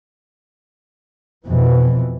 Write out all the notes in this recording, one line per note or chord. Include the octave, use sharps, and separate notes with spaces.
F2 B2 E3